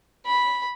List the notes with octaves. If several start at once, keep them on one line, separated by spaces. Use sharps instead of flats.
B5